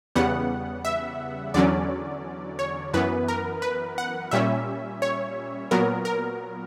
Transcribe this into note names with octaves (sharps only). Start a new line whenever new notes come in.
E2 C#3 G3 B3 F#5
E5
E2 D3 F#3 C#4 D5
C#5
F#2 E3 B3 B4
A#4
B4
F#5
A#2 G3 C#4 E5
C#5
A#2 F#3 B3 A#4
A#4